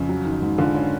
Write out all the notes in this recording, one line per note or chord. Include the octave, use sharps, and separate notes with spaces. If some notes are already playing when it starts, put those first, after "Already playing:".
Already playing: F2 C#3
F#3
D#3
G#2
D3 F4
C#4